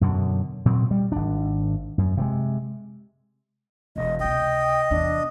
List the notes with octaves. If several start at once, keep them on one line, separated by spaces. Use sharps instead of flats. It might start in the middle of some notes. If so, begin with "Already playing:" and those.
F#2 B2 D3
A#2 F#3 C4
G3
G#1 D4
F#2
C3 E3 G#3
E1 D#5
C#2 C3 D#5 G5
E2 C3 D4